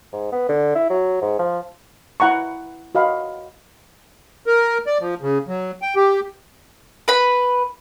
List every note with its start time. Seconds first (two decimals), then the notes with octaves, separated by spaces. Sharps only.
0.13 G#2
0.32 B3
0.49 D3
0.76 E4
0.90 F#3
1.22 G#2
1.39 F3
2.20 E4 F#5 A#5 C#6
2.95 F#4 D#5 F5 B5
4.46 A#4
4.87 D5
5.01 F3
5.22 C#3
5.48 F#3
5.82 G5
5.96 G4
7.08 B4 B5